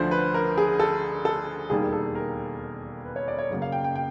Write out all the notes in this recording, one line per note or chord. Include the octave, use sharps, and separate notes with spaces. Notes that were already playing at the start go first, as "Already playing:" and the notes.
Already playing: D2 D3 F3 C5
B4
A#4
G#4
A4
A4
E1 D#2 D#3 G3 A#3 G#4
A4
A#4
B4
C#5
D5
C#5
F#2 C#3 F#3 A#3
F5
G5
G5
G5